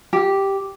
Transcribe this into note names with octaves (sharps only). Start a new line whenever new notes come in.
G4